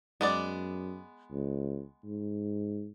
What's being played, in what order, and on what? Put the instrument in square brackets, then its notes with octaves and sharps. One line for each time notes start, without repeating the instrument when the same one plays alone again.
[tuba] F#2 [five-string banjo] G#3 B3 D5
[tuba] C#2
G#2